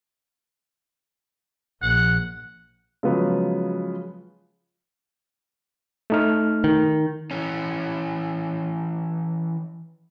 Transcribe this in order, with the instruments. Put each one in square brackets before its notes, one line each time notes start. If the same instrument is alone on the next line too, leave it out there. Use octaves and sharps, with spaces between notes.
[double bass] A#1 [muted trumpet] F#5
[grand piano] C#3 F3 F#3 G#3 B3
[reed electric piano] A3 D#4 F6
[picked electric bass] D#3
[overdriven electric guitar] E3 C#4